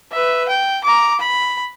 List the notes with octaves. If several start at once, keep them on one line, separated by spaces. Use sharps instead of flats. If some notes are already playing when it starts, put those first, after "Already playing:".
B4 E5
G5
A#5 D6
B5